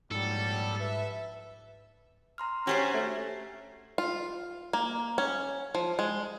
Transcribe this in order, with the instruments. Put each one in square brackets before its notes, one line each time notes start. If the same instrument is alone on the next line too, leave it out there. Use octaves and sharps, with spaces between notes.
[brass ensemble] A#1 F#3 G3 [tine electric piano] G#2 [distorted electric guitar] A4
[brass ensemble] B4 E5
[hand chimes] A#5 C6 F6
[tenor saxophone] C#4 [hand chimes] D4 A6 C7 [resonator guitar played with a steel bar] F#4 G4 C5
[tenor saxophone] A3
[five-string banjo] F4
A#3
C#4
F3
G#3